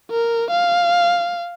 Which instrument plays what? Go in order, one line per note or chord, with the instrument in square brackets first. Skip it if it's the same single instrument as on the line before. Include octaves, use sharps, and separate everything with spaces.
[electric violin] A#4
F5